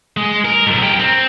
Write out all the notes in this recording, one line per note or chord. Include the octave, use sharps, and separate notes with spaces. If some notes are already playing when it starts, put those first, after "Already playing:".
G#3
A#4
B1 G#2
G4 A#4
C4